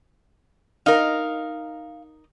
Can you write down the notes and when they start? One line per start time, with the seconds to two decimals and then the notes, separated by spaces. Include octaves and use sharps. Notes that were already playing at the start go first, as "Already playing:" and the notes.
0.86 D#4 A#4 F5